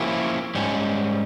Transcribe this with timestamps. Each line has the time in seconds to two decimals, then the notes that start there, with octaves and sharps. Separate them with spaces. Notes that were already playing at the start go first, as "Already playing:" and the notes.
Already playing: F3 A#3 C#4 E4 G4
0.55 G#2 G3 C#4